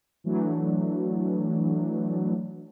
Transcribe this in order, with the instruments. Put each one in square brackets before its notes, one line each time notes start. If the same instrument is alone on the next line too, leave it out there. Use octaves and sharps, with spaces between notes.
[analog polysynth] E3 F#3 A3 D4